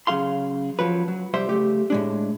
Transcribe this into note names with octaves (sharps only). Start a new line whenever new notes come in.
C#3 F#3 G#4 F5 C6
F3 F#3 B4
F#3
C2 G3 C5 E5 C6
C#3 A3 G4
A2 G#3 D4